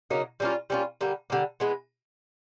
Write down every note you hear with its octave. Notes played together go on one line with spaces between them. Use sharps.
C#3 F#3 A#3 D#4
G3 A#3 C#4 F4
G3 A#3 C#4 F4
D3 G3 A#3
D3 G3 A#3
E3 G#3 B3